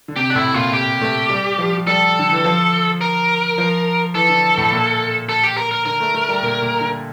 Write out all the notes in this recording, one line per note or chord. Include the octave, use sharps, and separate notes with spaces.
D3
C3 G4
D4
A2 E4
A#2 F4
G4
A3
G3
F3
G3 A4
D3
E3
F3
A#4
F3
E3 A4
D3
A2
A#2
A4
G4
A#4
A#4
D3 A#4
A3
A3
G3
A#2
A#2
D3